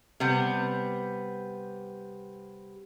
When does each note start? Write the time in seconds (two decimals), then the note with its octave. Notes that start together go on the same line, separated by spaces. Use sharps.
0.20 C3 G3 B3